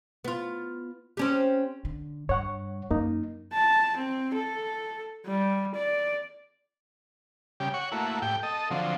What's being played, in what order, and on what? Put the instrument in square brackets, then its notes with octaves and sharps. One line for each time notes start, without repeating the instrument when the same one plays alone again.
[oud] B3 F4
C4 C#4 G4
[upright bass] D3
[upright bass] G2 [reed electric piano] C#5 F#5 C#6
[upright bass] F#2 [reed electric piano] A#3 D#4
[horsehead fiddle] A5
C4
A4
G3
D5
[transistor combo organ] C#3 G3 G4
C#5 F#5 C#6
A3 A#3 E4 F#4
A2 G4 G5
A4 D#5
D3 F3 F#3 C4